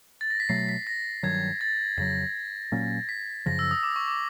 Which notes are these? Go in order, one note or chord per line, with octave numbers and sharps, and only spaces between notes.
A6
A#6
B6
B2 F#3 A3 C7
B6
A#6
G2 D#3 F#3 G#6
A6
F2 C#3 F#3 A#6
A#2 F#3 A#3 C#4
B6
F#2 C#3 F3 A#6
E6
D#6
D6
C#6
D6